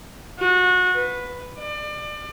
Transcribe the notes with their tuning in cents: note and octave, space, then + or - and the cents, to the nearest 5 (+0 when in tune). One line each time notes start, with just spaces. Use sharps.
F#4 -25
B4 +5
D5 +30